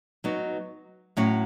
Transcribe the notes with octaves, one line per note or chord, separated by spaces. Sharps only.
F#3 B3 D#4
A2 F#3 C#4 F#4